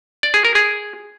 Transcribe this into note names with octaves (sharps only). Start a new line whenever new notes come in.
D5
G#4
A#4
G#4